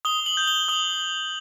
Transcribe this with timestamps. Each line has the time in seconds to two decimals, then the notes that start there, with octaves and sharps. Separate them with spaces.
0.05 D#6 G7
0.26 F#7
0.37 G6
0.47 G7
0.68 D#6 F#7